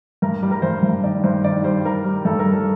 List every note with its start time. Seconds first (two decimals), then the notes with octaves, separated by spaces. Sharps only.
0.22 G2 A#4
0.43 G3
0.51 A#4
0.62 G2 C5
0.83 G2
1.04 D#3 D5
1.24 G2 C5
1.44 D#3 D5
1.64 G3 C5
1.84 D#3 A#4
2.05 G3
2.25 G2 A4
2.39 A#4
2.45 G3
2.52 A4